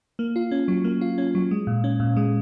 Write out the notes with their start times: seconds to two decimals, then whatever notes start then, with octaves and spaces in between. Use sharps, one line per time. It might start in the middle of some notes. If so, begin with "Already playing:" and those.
0.19 A#3
0.36 F4
0.51 C#4
0.68 F#3
0.84 A#3
1.01 F4
1.18 C#4
1.35 F#3
1.51 G#3
1.67 A#2
1.84 C#4
2.00 A#2
2.16 G#3